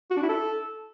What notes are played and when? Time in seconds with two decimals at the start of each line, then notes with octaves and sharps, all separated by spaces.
0.11 F#4
0.17 D4
0.23 E4
0.29 A4